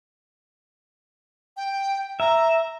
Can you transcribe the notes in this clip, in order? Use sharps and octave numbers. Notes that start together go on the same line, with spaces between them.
G5
E5 A#5